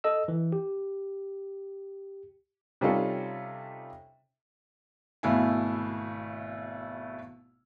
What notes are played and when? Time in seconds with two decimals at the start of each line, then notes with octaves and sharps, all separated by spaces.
0.04 A4 D#5 E6
0.28 E3
0.53 G4
2.81 C3 G3 C#4 D#4 F4 A4
5.23 G#1 B2 A3 E4 F5 G#5